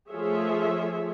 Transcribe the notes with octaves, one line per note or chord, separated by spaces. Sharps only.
F3 A3 F4 G#4 C#5 E5